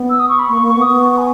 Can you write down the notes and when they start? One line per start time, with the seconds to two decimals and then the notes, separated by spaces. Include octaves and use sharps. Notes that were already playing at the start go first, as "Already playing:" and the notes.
Already playing: B3
0.10 E6
0.19 D#6
0.29 C#6
0.39 B5
0.48 A#3 C#6
0.62 A#3
0.68 C#6
0.75 B3
0.82 D#6
0.88 B3
0.95 C#6
1.18 G#5